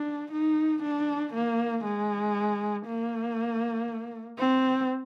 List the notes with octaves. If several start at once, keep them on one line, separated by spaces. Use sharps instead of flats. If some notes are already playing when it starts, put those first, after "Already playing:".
Already playing: D4
D#4
D4
A#3
G#3
A#3
C4